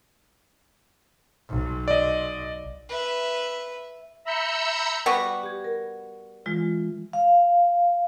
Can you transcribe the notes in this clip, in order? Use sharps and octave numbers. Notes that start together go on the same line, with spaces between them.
B1
D5 D#5
B4 E5
E5 A#5 B5 E6 G6 C#7
G3 B3 F#4
G4 G#6
A#4
E3 G#3 F4
F5